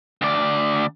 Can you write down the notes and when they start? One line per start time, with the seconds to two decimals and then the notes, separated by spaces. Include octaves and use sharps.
0.22 D2 D5